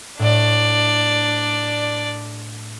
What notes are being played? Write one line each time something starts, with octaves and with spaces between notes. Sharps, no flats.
A2 D4 D5